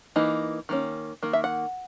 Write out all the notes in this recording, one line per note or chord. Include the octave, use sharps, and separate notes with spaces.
E3 A#3 D#4
D#3 A#3 C#4
D#3 A#3
E5
F#5